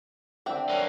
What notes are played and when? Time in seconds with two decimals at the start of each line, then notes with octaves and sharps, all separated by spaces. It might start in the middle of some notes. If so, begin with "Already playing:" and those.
0.46 D3 C4 D4 G4 E5 G5
0.69 A#3 C#4 B4 A5